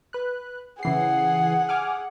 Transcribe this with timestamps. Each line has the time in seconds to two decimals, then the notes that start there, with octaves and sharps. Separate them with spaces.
0.13 B4 F#6
0.83 C#3 E3 G#4 F#5 C7
1.69 G#5 D6 F6